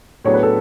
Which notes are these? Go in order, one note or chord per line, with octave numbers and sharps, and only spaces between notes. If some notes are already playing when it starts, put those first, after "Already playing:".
A2 F#3 B3 D4 G#4 C#5
B4
A4